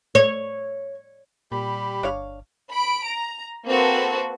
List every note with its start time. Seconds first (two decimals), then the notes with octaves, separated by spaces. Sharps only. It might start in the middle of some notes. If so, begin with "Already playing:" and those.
0.15 C#5
1.52 A#2 G3 G4 B5
2.03 G1 D4 C#5 F5
2.73 B5 D7
3.06 A#5
3.68 A#3 C4 F#4 A4 B4